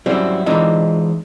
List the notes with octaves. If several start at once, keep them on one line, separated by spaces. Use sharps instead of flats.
F#3 G3 C4 C#4 E4 F#4
E3 G#3 C4 D4 D#4 F4